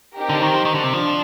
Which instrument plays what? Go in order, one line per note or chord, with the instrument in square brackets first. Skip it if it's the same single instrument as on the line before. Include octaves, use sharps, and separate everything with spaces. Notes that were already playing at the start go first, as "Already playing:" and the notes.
[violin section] C4 D#4 G4 A#4
[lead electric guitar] D3
D#3
F3
D#3
D3
C3
[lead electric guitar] F3 [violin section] D4